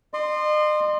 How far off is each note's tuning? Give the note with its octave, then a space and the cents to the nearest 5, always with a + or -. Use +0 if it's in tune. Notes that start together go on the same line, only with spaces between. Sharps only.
D#5 -40 C6 +0